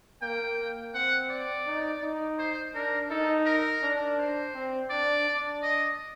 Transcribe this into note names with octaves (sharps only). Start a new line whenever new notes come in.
A#3 G5
C4 F#5
D5
D#4
D#4
C5
D4 A#4
D#4 A4
A#4
D4
C5
C4
D4 D5
D4
D#5